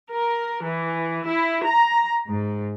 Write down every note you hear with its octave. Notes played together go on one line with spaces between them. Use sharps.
A#4
E3
E4
A#5
G#2